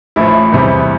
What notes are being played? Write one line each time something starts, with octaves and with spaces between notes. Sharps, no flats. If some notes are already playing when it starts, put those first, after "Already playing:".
A1 A2 F3 E4
E2 C3 G3